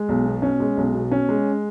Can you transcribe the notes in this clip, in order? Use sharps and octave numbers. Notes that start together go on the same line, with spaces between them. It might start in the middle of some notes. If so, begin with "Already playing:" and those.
Already playing: G#3
B1
B2
C#4
G#3
B1
B2
C#4
G#3